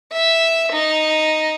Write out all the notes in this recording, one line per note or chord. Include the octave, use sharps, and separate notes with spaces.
E5
D#4